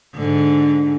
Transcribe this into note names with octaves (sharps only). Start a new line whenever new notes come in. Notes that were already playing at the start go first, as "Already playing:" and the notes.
G#2 D3